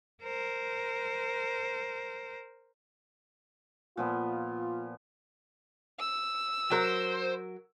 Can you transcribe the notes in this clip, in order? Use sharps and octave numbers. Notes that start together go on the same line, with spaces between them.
A#4 C5
A#2 F3 B3 F4
E6
F#3 A#4 C5